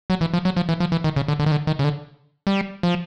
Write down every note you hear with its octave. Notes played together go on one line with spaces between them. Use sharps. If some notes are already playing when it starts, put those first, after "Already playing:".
F#3
E3
F3
F#3
F3
E3
F3
E3
D#3
C#3
D3
D3
D#3
D3
D#3
C#3
D3
G3
F3